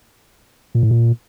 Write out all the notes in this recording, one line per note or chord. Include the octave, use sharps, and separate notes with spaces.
A#2
A2
A#2